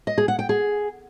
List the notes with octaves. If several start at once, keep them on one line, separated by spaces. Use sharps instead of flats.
D#5
G#4
F#5
G5
G#4